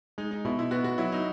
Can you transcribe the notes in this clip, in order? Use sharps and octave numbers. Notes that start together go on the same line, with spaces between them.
G#3 D#4
D#4
B2 E4
E4
B3 F#4
F#4
F#3 E4
D#4